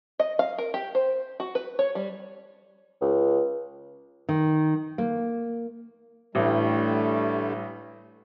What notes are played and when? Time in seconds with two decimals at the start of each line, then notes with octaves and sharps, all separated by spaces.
0.19 D#5
0.39 F5
0.58 A#4
0.74 G4
0.95 C5
1.40 F#4
1.55 B4
1.79 C#5
1.95 G3
3.01 C#2
4.29 D#3
4.98 A#3
6.35 A1 D3 G3 A3